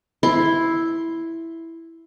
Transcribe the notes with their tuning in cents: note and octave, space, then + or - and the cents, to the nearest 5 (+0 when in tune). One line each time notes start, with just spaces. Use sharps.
E4 +0 C6 +10